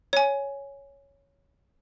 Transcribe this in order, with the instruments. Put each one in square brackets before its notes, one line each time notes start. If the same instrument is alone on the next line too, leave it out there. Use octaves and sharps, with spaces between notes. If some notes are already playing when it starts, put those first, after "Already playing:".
[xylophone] C#5 G#5